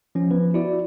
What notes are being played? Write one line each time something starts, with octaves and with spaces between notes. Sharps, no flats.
F3 C#4
F3 B3 B4
E4 F#4 D5